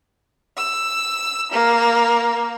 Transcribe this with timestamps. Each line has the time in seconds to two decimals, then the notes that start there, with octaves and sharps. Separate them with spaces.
0.57 E6
1.51 A#3